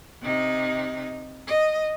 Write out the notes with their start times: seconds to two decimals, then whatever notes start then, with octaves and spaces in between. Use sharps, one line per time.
0.22 C3 D#4
1.47 D#5